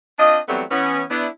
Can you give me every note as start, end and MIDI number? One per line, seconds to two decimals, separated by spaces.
0.19 0.38 60
0.19 0.38 62
0.19 0.38 65
0.19 0.38 75
0.49 0.64 52
0.49 0.64 54
0.49 0.64 55
0.49 0.64 57
0.49 0.64 59
0.49 0.64 60
0.71 1.03 52
0.71 1.03 59
0.71 1.03 61
1.10 1.27 59
1.10 1.27 62
1.10 1.27 64